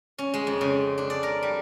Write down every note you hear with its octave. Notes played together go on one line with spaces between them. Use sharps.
C#4
G#3
F2
C#3
D4
D5
A#4
G3